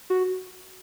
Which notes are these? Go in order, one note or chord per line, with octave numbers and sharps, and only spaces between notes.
F#4